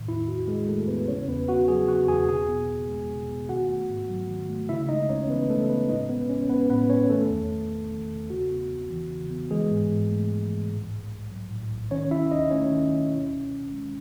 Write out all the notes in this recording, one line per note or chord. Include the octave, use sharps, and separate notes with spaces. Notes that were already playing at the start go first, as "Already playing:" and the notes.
Already playing: A2 D#3
E2 E4
E2 F#4
G#3 G#4
D#3 A3 A4
E2 B3 B4
C#3 C#4 C#5
E2 B3 B4
E2 F#4 F#5
F#3 G#4 G#5
C#3 F#4 F#5
E2 G#4 G#5
B2 G#4 G#5
B3
E2
G#3
B2
B3
D#3 F#4 F#5
A3
G#2
F#3
D#3
A3
C#3 E4 E5
G#3 D#4 D#5
C#2 C#4 C#5
E3 B3 B4
C#3 A3 A4
G#3 B3 B4
A2 D#4 D#5
B3 C#4 B4
A1 C#4 C#5
G#3 B3 B4
A2 B3 B4
C#4 C#5
D#3 A3 A4
E2
E2
A3
D#3
E2
C#3 F#4
B3
C#2
E3
C#3
B3
E3 G#3 G#4
G#2
G#2
A3
E3
G#2
A2
B1
B1
F#3
A2
B1
D#3 C#4 C#5
C#4 E4 E5
D#2 D#4 D#5
A3 C#4 C#5
D#3
C#4
B2
C#2
C#2
G#3